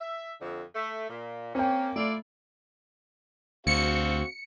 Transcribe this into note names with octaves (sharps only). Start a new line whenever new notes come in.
E5
F2 D3
A3
A#2
A#3 C4 C#4 G5
A3 E4 F4 D5
D2 C4 F#4 F5 C#7